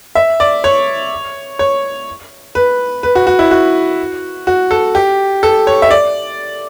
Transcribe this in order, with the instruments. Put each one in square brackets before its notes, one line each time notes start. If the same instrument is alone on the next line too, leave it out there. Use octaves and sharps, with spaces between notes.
[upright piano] E5
D5
C#5
C#5
B4
B4
F#4
F#4
E4
F#4
F#4
A4
G4
A4
C#5
E5
D5